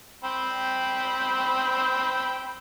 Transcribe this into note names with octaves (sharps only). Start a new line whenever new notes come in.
C4 G5 B5